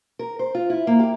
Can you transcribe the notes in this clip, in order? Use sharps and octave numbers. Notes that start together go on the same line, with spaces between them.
A#4
C5
F4
E4
A#3
G4